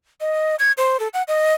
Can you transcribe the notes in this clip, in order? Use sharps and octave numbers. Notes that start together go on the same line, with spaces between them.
D#5
G#6
C5
A4
F#5
D#5